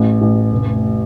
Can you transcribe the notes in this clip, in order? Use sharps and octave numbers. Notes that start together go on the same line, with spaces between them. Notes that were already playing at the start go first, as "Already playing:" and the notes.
Already playing: A1
A1
F1